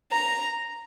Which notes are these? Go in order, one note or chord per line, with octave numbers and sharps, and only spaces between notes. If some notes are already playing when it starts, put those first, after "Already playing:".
A#5